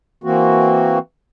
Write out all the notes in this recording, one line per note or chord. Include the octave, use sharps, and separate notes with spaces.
E3 A#3 C4 F#4